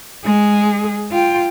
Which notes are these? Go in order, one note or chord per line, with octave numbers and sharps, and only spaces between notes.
G#3 G#4
F4 G5